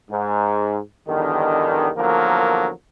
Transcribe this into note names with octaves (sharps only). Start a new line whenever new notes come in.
G#2
E2 G2 D3 D#3
E2 D3 F3 F#3 A#3 A#4